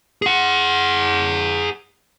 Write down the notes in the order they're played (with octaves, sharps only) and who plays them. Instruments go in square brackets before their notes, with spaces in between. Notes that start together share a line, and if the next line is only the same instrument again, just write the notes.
[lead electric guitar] G#4 F#5